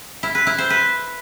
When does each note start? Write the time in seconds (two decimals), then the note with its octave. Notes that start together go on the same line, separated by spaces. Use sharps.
0.23 E4
0.35 B4
0.47 E4
0.58 C5
0.70 B4